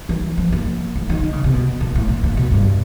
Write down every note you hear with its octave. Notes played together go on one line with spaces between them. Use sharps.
E3
F3
A#3
A3
D#3
D#3
C#3
C3
B2
A#2
A2
A#2
A#2
B2
G2